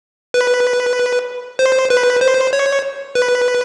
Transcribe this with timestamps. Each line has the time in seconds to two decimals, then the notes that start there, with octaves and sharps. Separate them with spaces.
0.34 B4
1.59 C5
1.90 B4
2.21 C5
2.53 C#5
3.15 B4